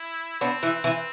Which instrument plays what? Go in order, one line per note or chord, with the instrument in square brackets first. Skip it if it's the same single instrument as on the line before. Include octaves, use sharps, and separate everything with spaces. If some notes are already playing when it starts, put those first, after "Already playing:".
Already playing: [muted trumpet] E4
[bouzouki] B3 D4 [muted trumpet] C4
[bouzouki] E3
E3